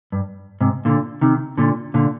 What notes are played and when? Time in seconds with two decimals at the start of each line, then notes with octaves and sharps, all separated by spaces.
0.12 G2
0.61 G#2 C3
0.85 A#2 D3
1.21 C3 D#3
1.58 A#2 D3
1.94 A#2 D3